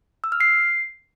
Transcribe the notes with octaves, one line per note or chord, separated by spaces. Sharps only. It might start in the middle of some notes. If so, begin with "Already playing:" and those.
E6
F6
C7